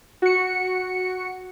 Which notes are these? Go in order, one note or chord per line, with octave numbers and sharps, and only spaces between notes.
F#4 C#7